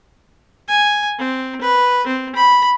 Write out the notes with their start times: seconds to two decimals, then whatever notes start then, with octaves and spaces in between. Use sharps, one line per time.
0.69 G#5
1.19 C4
1.62 B4
2.07 C4
2.36 B5